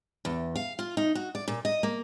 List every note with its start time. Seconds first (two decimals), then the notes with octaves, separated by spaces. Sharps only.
0.25 E2
0.56 F5
0.79 F4
0.97 D#4
1.15 F#4
1.35 D5
1.48 A#2
1.65 D#5
1.83 A#3